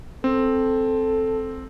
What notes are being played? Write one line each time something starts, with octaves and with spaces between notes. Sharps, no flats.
C4 A4